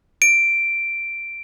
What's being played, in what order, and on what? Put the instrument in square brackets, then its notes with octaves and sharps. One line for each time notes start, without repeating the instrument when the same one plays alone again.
[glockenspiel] D7